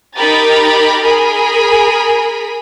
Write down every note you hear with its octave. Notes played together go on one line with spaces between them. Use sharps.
D#4 G4 A#4 A#5 B5 A6
G#4 A#4 B5